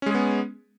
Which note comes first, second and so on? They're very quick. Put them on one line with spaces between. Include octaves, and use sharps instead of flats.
C#4 G#3 G#4 B3